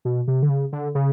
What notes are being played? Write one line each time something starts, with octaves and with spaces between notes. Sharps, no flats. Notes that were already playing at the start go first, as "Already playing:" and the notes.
B2
C3
D3
C#3
D3
C#3